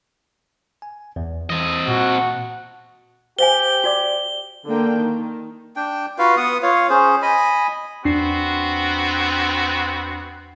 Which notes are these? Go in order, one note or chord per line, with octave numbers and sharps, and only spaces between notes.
G#5
E2
E3 C4 D#5
A#2 F#4
G4 C5 F5 G#5 G7
F#4 D5 D6
D3 A#3 D4 G5
D#3
D4 G5
F4 F#4 B4 F5
B3 F#5 D#6
F4 C#5 F5
C#4 G#4 C5
D#5 G#5 B5
E2 B3 C4 D4 F#4 C7